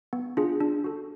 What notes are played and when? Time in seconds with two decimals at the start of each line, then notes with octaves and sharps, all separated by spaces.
0.13 B3
0.37 D4 F4 G#4
0.60 D4
0.84 F#4 A4